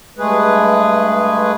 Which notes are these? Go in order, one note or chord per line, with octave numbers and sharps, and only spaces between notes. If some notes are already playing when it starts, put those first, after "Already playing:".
G2 G#3 A3 G#4 B4